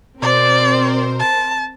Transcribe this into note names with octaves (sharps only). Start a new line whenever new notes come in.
B2 C4 A#4 C5 D5
A5